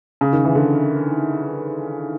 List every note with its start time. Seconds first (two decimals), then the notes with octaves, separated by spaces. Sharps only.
0.21 C#3
0.33 D#3
0.44 E3
0.55 D3